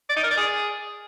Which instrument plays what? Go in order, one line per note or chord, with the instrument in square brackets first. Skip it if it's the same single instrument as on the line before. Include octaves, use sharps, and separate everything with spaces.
[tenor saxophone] D5
D#4
A#4
D5
G#4